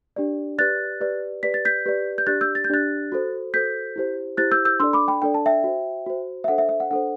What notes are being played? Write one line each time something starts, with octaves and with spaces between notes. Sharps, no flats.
D4 G4 D5
G4 B4 D5 F#6 A6
G4 B4 D5
G4 B4 D5 B6
A6
G6 B6
G4 B4 D5
G6
D4 G4 D5 F#6 A6
E6 G6
A6
G6
D4 G4 D5 F#6 A6
F#4 A4 C5
F#4 A4 C5 G6 B6
E4 G4 C5
E4 G4 C5 F#6 A6
E6 G6
E6 G6
D4 A4 D5 C6 E6
B5 D6
G5 B5
D4 A4 D5 G5
A5
E5 G5
F#4 C5
F#4 C5
E5
D4 A4 C5 F#5
E5
E5
F#5
D4 A4 C5 F#5